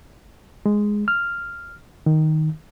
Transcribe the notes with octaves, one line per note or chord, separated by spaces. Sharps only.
G#3
F6
D#3